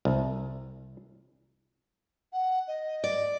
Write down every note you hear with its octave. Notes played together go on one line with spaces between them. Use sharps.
C2
F#5
D#5
D5